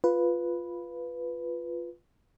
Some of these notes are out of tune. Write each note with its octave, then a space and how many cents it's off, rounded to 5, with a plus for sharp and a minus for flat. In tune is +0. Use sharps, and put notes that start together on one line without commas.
F4 +0 B4 +0